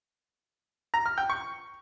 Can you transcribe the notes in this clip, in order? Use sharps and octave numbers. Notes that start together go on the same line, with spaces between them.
A#5
F6
G5
C#6